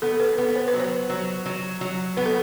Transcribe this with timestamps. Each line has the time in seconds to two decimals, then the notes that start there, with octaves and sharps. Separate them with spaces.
0.02 B3 A4
0.20 B4
0.29 A4
0.38 B3 B4
0.56 C5
0.68 B4
0.74 F#3
0.80 C5
1.10 F#3
1.46 F#3
1.81 F#3
2.17 B3 B4
2.25 A4